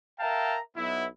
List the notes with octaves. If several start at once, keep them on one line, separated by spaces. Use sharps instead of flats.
A#4 E5 F5 G5 A5 A#5
B1 B3 E4